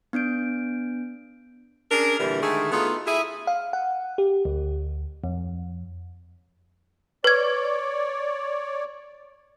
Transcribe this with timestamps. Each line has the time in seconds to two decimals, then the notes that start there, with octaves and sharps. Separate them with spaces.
0.13 B3 D4 G6 D7
1.91 C#4 D4 G#4 A#4
2.19 A#2 D3 E3 G3
2.42 D3 D#3 G#3 A3 G#4
2.72 A3 B3 D#4 F4 F#4 G#4
3.07 E4 G#4
3.47 F5
3.73 F#5
4.18 G4
4.45 D2
5.24 F2
7.24 B4 C#5 D5 G#6